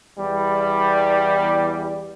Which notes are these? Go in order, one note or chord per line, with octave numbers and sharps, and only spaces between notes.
E2 G3